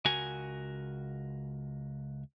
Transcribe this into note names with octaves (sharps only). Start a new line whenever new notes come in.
C#2 F#4 A#4 G#5